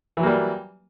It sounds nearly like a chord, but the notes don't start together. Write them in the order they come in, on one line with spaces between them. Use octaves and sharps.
E3 F#3 A#3 G3